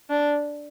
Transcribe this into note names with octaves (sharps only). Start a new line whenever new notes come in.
D4